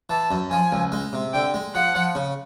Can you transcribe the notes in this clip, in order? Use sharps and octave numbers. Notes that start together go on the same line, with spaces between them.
E3 A5
F#2
F3 G#5
C#2
G#3
C3
D3 G5
G#3
F3 F#5
F3
C#3